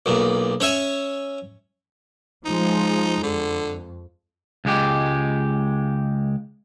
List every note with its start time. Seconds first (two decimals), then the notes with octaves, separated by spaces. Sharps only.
0.06 B1 A#2
0.60 C#4 C#5 E5 G#5
2.45 F3 G#3 D#4
3.23 F2 D3
4.65 C#2 G#3 G4